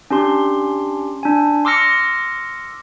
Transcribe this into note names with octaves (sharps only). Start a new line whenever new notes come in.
C#4 D4 G4 C6
D4 G#5
C6 D6 E6 F6 A#6 C#7